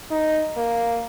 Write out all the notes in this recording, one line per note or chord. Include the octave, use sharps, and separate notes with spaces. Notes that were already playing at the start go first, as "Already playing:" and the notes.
D#4
A#3